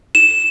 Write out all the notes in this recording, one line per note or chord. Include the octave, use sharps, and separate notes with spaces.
E7